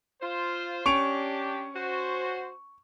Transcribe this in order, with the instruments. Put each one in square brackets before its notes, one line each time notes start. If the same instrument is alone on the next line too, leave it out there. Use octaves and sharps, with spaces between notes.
[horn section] F4 C5
[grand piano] C#4 D7 F7 [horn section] D4 G4 [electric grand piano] C#6
[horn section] F#4 C5